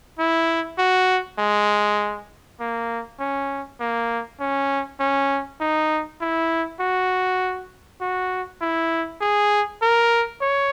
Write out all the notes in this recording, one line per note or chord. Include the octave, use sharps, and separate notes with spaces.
E4
F#4
G#3
A#3
C#4
A#3
C#4
C#4
D#4
E4
F#4
F#4
E4
G#4
A#4
C#5